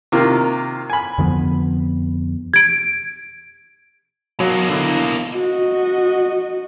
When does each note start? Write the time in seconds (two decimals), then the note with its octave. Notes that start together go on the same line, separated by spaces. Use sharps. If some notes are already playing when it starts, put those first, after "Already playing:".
0.12 C3 D#3 A#3 F4
0.90 G#5 B5
1.18 F2 D3 F3 B3
2.54 G#6 D7
4.40 B2 F#3 A#3
4.70 D3 E4
5.33 F#4 D#5